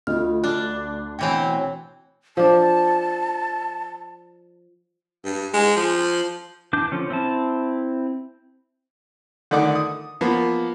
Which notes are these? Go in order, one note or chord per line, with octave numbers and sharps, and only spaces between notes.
D2 F4 D#5 F6
D4 F#6
B2 E3 C4 C#5 G5
F3 D4 A5
G2
G#3
F3
E3 D4 D6 G6
D3 F3 C#4
C4 E4 A5
D3 D#3 A3 D5 F#5 D6
D#6
F3 A#3 B3